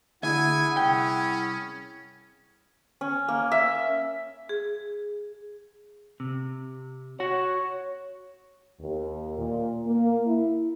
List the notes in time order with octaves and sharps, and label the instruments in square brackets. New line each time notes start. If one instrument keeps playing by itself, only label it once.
[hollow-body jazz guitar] D2 E5 [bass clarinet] E4 [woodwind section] G#4 F#5 [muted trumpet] G#5
[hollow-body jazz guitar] C2 G5 [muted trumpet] C#4
[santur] C#4
A#3
E5
[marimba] G#4
[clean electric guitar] C3
[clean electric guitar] F#4 F#5 [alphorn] C#5
[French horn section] D#2
A#2
A#3
E4